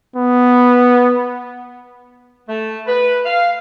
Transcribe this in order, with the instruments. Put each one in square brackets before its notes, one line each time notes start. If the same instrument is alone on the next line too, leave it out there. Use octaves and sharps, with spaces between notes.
[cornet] B3
[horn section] A3
B4
F5